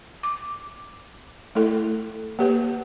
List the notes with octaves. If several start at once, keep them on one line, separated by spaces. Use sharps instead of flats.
D6
A3 E4 A4
A#3 G4 B4